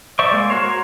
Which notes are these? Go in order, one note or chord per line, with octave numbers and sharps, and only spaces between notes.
C5 D5 E5 C#6
G#3 A#3
F#4 A#4 C5 C#5